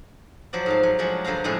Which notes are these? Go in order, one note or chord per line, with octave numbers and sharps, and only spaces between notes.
F3 F#3 C5 D5
G#2 A3 F5
F#3
F3 F#3 G#3 D4
G2 D3 C5 F5 A#5
F2 A2 D3 G#3 A3 B3